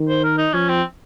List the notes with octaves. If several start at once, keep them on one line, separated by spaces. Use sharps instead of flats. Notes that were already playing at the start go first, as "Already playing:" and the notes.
Already playing: D#3
C5
A#4
D#4
F3 C#4
C4